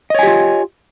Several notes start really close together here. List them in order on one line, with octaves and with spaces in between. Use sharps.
D#5 C#5 G#5 G4 F4